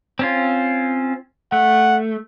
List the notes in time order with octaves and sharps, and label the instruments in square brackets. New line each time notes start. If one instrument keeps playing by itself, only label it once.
[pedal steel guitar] C4 C#4 F4
[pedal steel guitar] A3 [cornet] F#5